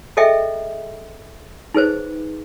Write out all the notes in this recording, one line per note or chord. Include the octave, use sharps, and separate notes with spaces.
G#4 A4 D#5 E5 G5
D#4 G#4 B4 C5